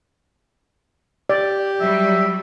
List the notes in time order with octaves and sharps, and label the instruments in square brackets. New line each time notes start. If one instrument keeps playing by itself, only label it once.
[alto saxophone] G4 [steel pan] D5
[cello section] F#3 G3 [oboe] E5